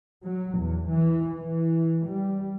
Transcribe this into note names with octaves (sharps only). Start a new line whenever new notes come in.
F#3
E2
E3
E3
G3